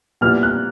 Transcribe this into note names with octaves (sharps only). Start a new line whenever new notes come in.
A#2 G3 B3 E4 F6
F#6